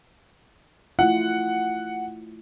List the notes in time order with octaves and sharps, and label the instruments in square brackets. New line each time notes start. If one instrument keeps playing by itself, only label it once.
[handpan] A3 E4 F4 [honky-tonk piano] F#5